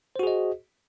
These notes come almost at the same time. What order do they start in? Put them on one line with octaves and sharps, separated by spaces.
C5 F#4 G#4 D#5